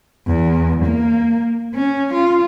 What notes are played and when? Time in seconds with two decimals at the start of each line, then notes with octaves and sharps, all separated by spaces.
0.27 E2
0.85 A#3
1.74 C#4
2.13 F4